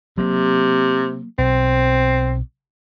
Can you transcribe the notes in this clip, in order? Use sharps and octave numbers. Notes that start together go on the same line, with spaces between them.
C3 F#3 A#3
B1 C4